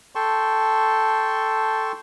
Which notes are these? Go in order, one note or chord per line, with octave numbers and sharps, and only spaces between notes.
A4 G5 A5 C6 C#6